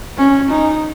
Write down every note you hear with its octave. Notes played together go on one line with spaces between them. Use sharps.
C#4
D#4